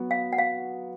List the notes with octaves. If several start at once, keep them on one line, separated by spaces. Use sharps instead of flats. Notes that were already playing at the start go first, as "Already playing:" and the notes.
Already playing: F#3 B3 F#4
F5
F#5
F5